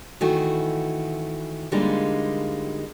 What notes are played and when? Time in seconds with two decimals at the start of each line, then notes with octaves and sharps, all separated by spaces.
0.21 D#3 E3 A3 E4 F#4
1.72 D3 G3 G#3 A#3 D#4 F4